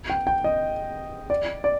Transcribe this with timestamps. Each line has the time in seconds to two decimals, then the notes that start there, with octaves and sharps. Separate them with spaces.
0.10 G5
0.27 G5
0.44 D#5
1.30 D5
1.64 D5